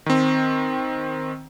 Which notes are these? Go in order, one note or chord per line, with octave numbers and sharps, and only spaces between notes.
D#3 C4